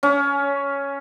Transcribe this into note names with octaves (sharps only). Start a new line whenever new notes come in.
C#4